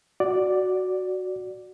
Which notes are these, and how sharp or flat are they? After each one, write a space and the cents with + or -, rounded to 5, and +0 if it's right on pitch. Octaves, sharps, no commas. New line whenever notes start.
F#4 +0 D5 +0